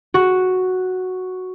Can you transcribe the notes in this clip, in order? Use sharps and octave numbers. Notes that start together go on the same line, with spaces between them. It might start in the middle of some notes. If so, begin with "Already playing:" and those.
F#4